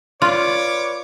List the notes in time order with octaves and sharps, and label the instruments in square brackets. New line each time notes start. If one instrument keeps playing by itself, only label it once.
[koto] F4 [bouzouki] B4 D5 [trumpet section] C#5 D6